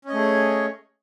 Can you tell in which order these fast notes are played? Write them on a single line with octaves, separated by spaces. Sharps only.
C#4 D#5 A3 G#4 C#5